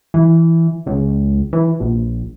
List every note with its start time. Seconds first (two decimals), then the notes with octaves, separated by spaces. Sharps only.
0.14 E3
0.86 C#2
1.53 E3
1.80 A#1